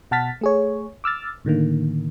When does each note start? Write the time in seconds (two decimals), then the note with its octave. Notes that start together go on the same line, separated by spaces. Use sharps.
0.11 B2 F#5 A5 F6 A6 B6
0.41 A3 G#4 C#5
1.04 D6 E6 F6 A6
1.45 A2 D3 D#3 A#3